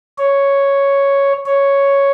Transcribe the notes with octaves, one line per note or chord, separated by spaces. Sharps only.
C#5
C#5